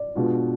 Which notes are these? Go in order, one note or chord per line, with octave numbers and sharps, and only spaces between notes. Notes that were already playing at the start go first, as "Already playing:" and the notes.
Already playing: D5
B2 G#3 D4 F4